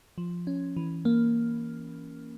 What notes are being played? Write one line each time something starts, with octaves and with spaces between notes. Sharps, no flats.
F3
C#4
E3
A#3